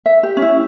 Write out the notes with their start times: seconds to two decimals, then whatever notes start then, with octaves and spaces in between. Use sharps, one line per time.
0.06 E5
0.23 G4
0.37 C#4
0.42 E4